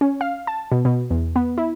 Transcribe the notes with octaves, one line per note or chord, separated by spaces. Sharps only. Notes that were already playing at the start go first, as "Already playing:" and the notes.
C#4
F5
A5
B2
B2
E2
B3
E4